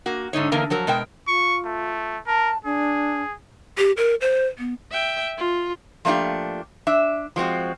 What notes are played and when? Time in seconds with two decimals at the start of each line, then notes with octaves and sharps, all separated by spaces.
0.06 A#3 F#4
0.33 G#2 D3 D#4 C#5
0.52 E2 D3 A#3 D#4 A#4 A#5
0.70 F3 F#3 A#4
0.87 B2 G#3 A#4 G5
1.28 F4 C#6
1.65 A3
2.27 A#4 A5
2.65 D4 G#4
3.78 G4
3.97 A#4
4.21 C5
4.58 B3
4.92 E5 G5
5.38 F4
6.05 F3 A3 A#3 D4 F4 G4
6.87 D4 E5
7.36 F3 G#3 C4 F#4